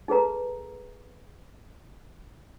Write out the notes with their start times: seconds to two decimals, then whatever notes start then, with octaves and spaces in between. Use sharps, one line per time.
0.08 D#4 G#4 A4 B4 A#5